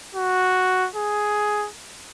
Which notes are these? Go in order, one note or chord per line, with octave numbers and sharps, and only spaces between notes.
F#4
G#4